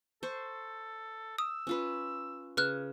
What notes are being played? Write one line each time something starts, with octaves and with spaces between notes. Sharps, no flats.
A4 C5 C#6
D#6 E6
C#4 F4 B4
C#3 B4 F6 F#6